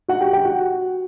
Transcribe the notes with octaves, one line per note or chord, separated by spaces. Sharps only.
F#4 F#5
G4 G5
G4 G5
F#4 F#5